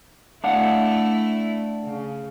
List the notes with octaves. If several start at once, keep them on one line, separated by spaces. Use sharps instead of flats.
A3 D4 E4 F5 F#5
C#3